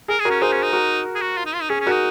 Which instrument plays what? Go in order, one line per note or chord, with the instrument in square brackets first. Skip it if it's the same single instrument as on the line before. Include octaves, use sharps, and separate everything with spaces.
[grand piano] G#4 [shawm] A#4
[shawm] G#4
[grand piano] F#4 A#4
[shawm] C#4
[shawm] D#4 [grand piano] G#4 C5
[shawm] C#4
D#4
[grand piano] F#4 A#4
[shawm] G#4
F#4
F4
D#4
F4
D#4
[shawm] C#4 [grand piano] G#4
[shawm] C#4
[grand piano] F#4 A#4
[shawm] D#4